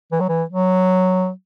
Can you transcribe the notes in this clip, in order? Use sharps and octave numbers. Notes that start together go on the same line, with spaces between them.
E3
F#3
E3
F#3